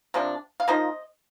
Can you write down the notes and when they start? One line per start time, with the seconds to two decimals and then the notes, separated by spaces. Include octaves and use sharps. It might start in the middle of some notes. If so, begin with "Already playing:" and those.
0.14 C3 F3 A#3 D4
0.60 F5
0.68 F3 A#3 D#4 C5 D#5